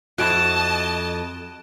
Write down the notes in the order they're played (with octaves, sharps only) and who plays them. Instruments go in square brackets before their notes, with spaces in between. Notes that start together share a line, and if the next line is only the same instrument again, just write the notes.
[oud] F2 E4 [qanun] F#4 [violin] D#5 A5 [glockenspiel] F#6 D7 E7